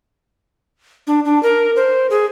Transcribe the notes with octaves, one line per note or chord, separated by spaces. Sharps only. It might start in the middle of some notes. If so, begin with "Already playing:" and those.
D4
D4
A#4
C5
G#4